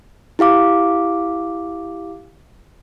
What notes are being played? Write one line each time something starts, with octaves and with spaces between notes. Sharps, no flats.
E4 G4 F5 D6